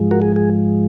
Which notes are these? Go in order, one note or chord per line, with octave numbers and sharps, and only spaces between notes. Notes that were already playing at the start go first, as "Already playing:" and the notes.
Already playing: G#2 F3 G#3
F#4 A#4
G#4
G#4